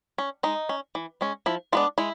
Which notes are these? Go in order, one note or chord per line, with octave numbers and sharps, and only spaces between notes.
C#4
G#3 D#4
C#4
E3
G#3 C#4
F3 E4
G#3 B3 D4 F4
G#3 E4